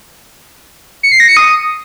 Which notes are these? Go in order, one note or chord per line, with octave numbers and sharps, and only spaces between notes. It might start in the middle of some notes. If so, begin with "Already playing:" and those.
C#7
C7
A#6
C#7
D#6